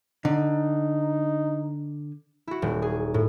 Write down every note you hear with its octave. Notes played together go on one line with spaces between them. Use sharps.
D3 D#4
E4 F#4
D#1
G#4
A2